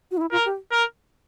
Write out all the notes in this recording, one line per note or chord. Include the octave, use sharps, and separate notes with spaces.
F#4
D#4
E4
F4 A#4
G4
A#4